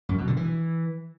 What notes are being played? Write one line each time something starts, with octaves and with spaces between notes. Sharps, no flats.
F#2
B2
D3
E3